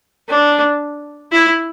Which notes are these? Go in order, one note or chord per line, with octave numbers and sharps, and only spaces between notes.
D4
E4